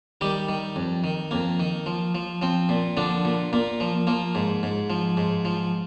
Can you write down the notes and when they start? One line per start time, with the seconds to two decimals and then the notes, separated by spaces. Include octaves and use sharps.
0.21 D#3 G3 G4
0.49 D#3
0.76 F2
1.04 D#3
1.31 F2 A#3
1.60 D#3
1.86 F3
2.15 F3
2.42 F3 C4
2.69 A#2
2.97 D3 F3 D4
3.25 A#2
3.53 A#2 A#3
3.80 F3
4.07 F3 A#3
4.35 G#2
4.63 G#2
4.90 F3
5.17 G#2
5.45 F3